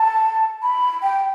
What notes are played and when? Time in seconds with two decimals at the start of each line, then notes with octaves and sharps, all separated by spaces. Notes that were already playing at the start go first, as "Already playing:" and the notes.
Already playing: A5
0.63 B5
1.03 G5